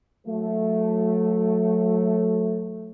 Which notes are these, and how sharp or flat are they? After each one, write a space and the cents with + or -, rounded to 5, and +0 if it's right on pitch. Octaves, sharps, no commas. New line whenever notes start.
F#3 -30 A3 +0